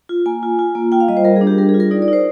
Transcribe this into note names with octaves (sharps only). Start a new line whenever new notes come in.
F4
A#3 G#5
F4
F4
A#3
F4 G5
F5
G3 D#5
C5
G3 A#4
G#4
D4
G4
G3 A#4
G#4
F4
A#4
D#4 D5
D5
D#4
C5